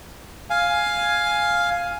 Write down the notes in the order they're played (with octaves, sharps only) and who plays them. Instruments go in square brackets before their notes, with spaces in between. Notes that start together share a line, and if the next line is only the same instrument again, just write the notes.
[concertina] F5 G#5